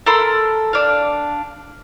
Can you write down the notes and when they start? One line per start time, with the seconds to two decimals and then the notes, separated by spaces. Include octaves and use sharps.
0.06 A4 A#4 B5 C6
0.73 D4 F5